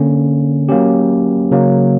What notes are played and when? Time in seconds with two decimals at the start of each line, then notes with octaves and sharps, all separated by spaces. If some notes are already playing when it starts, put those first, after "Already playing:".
Already playing: D3 A#3 C#4
0.69 F#3 A#3 C#4 G4
1.51 C#3 F#3 A#3